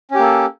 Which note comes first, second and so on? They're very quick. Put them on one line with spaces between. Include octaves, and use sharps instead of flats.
C#4 G4 A#3 A4